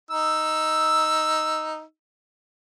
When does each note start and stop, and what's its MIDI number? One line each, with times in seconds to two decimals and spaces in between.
0.11 1.82 63
0.11 1.82 88